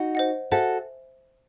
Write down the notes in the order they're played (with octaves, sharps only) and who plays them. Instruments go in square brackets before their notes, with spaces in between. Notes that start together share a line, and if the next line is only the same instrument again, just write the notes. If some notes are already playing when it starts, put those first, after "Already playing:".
Already playing: [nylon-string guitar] D#4 F#4
[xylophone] C5 D#5 F#5
[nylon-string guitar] F#4 A4 [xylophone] C5 E5 G#5